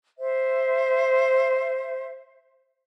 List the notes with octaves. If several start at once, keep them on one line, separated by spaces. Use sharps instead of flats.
C5 E5